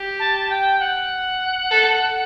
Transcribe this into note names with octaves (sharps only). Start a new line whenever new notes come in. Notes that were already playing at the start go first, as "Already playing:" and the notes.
Already playing: G4
A5
G5
F#5
A4